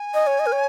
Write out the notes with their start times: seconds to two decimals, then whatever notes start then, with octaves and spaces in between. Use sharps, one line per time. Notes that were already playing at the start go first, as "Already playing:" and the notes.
Already playing: G#5
0.14 D#5
0.27 C#5
0.40 D#5
0.46 A#4
0.53 C#5